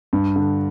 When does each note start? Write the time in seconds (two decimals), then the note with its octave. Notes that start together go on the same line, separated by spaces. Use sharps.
0.13 G2
0.36 D3